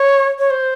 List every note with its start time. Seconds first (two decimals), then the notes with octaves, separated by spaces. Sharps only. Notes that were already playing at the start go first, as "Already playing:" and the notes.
Already playing: C#5
0.39 C#5
0.51 C5